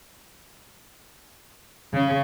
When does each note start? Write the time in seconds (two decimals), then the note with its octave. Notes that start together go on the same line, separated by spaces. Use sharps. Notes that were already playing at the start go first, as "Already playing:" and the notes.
1.93 C#3